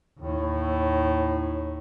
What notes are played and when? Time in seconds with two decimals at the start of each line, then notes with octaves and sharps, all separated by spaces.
0.19 D#2 A2